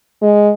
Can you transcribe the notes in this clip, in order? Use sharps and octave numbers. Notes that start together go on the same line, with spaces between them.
G#3